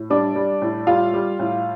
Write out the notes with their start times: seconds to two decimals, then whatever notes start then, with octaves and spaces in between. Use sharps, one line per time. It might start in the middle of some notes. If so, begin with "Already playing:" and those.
Already playing: A2
0.10 G3 D4 D5
0.35 G3
0.62 A2
0.87 G3 F4 F5
1.14 G3
1.39 A2